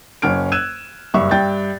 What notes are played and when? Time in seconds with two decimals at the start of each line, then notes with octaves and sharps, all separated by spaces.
0.22 F#1 C#4 F6 D7
0.52 E6 F#6 G#6 D#7 E7
1.14 F#1 G2 E5 C#6
1.31 G2 E5 G5 G6 A6